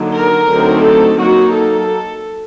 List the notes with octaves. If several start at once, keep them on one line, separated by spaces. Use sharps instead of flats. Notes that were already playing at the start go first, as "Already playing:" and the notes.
Already playing: D3 F#3 A#3 D#4
A#4
D3 F#3 A3 C4 D#4
A4
F#3 A#3 D#4 F#4
A4